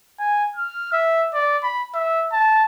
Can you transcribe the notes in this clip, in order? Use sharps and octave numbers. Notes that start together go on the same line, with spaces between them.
G#5
F6
E5
D5
B5
E5
A5